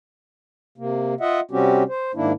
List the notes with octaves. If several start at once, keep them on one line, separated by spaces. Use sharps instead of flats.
C3 A#3
F4 D#5 E5 F#5
C3 G3 C4 C#4 F#4 G4
C5
G#2 D#3 A#3 D4 E4